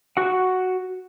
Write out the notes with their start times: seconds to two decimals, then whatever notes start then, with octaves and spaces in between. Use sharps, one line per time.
0.17 F#4 F#5